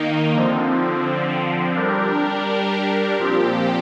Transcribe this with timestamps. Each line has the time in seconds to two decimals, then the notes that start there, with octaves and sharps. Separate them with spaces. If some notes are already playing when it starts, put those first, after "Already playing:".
Already playing: D#3 A#3 D#4
0.33 D3 F3 C4
1.76 G3 D4 G4 A#4
3.18 A#2 F3 C4 G4